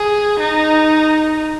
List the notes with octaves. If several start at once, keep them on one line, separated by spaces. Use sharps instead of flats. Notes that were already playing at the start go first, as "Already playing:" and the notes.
Already playing: G#4
D#4